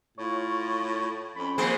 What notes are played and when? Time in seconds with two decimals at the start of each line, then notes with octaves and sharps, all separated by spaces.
0.18 A2 F4 C#5
1.36 F2 C#4 B5
1.58 B2 F3 A#3 C4 G#4